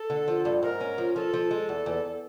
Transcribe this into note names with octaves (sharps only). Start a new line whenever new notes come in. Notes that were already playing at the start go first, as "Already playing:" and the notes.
Already playing: A4
D3
F3
G2
G#2 A#4
C#4
F3
F3 A4
F3
G#3
E2
E2